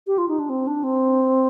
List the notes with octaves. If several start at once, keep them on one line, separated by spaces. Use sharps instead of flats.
G4
F4
D#4
D4
C4
D4
C4